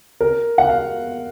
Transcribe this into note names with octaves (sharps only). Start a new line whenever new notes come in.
A#4
F#5
F5